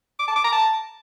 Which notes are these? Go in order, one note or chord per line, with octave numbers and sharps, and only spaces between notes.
D6
A5
D6
A#5
A5